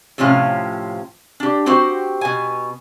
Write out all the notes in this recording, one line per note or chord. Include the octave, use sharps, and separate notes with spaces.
A2 C3 F3 C#4 F4
D4 G4
C4 F#4 G4 C5
B2 G#5